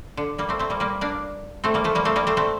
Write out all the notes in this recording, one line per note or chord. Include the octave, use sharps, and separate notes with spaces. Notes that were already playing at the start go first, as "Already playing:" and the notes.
D3
G3 A#3
A3 C4
A3 C4
G3 A#3
G3 A#3
A#3 D4
A3 C4
G3 A#3
F3 A3
G3 A#3
A3 C4
G3 A#3
A3 C4
A3 C4